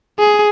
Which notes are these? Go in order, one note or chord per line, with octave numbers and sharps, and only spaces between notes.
G#4